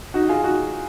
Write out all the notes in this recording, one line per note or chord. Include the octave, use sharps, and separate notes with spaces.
D#4 F#4
F4 G#4
D#4 F#4